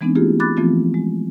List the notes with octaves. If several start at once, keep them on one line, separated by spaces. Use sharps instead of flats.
E3 G#3 B3 C4 D4 D#4
A3 A#3 E4 F4 G4 G#4
B5 D6 F#6 A6
E3 F3 A3 B3 C4 F4
G#3